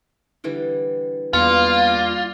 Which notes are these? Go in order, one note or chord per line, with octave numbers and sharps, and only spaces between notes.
D3 E3 G3
E2 G3 A#3 F4 B4 F#5 A#5